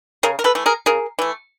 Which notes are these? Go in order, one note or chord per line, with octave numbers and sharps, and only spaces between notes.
C#3 G#4 A#4
A#4
A4 B4
E3 A3
G#4 A#4
C#3 G#4 A#4
E3 A3